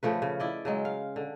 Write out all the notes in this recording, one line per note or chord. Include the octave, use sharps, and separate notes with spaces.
C#3 F3 A3 B4
C#3
E4 D5 D#5
C#3 F#3 G#3
F5
D3